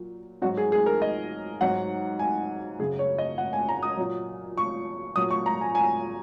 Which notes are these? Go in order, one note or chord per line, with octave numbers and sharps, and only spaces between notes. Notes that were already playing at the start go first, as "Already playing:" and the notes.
Already playing: A#2 F#3
G#2 F#3 F#4
G#4
G#4
A#4
D#5
G#2 F#3 F#5
G#5
F#2 C#3 F#3 G#4
C#5
D#5
F#5
G#5
A#5
D#6
A#2 F#3
C#6
A#2 F#3 D#6
C#6
A#5
G#5
G#5